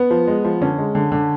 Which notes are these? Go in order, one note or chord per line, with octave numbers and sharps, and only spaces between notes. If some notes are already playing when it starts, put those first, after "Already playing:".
Already playing: B3
F3
G#3
F3
D3 C#4
G#3
D3
D3